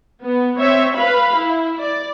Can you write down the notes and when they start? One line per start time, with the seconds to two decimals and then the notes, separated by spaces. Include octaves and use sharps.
0.23 B3
0.59 C4 C#5 E5
0.95 B4 F5 B5
1.34 E4
1.80 D5